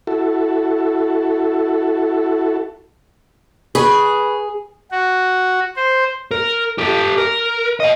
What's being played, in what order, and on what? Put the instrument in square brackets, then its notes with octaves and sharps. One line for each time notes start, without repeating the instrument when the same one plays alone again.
[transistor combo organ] E4 F#4 A4
[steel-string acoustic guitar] G#4 [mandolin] B4 B5 C#6
[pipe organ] F#4
C5
[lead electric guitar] A#4
G4 A4
A#4
D#5 F#5